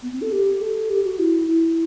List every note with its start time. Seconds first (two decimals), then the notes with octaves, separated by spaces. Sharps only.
0.02 B3
0.13 C4
0.22 A4
0.32 G4
0.61 A4
0.90 G4
1.04 F#4
1.19 E4
1.48 E4